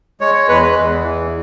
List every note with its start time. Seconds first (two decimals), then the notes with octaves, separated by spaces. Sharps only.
0.21 G#3 C#5
0.35 C#5
0.48 E2 B4
0.62 B4
0.76 E2
1.03 E3